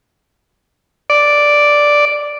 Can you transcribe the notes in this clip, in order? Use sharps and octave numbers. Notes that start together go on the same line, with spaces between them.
D5